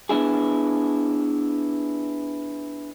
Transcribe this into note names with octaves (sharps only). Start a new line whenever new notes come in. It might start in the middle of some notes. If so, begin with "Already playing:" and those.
B3 D4 E4 G#4